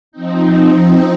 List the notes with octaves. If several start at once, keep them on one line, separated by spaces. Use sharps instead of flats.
F3 C4 D#4